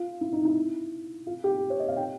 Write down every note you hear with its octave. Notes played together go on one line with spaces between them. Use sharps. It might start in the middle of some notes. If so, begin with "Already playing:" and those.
Already playing: F4
E4
D#4
E4
F4
G4
C#5
D#5
F5
G5